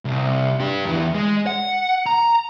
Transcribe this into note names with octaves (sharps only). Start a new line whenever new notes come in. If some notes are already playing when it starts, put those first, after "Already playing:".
C2
D4 G4
E2 E3
G#3
F#5
A#5